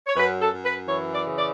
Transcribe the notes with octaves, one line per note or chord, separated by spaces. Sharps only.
C#5
F#2 B4
A4
F#2
B4
E3 C#5
D5
C#3
D5